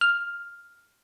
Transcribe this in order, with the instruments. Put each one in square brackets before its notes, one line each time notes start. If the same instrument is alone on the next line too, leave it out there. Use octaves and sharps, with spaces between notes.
[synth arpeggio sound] F6